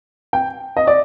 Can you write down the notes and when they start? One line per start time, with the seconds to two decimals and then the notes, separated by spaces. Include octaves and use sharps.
0.33 G5
0.77 D#5
0.87 D5